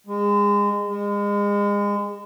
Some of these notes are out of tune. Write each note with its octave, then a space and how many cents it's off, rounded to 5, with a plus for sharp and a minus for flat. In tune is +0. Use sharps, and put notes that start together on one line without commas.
G#3 -25
G#3 -30